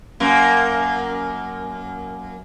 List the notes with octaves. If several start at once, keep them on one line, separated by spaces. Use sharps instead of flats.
F#2 A#3